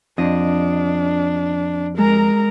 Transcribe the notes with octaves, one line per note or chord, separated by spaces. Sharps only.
F2 D4 D#5
G#3 A#4 A#5